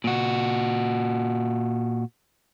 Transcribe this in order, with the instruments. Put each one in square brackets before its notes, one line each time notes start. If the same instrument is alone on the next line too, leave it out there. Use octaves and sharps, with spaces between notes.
[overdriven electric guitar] A#2 F#4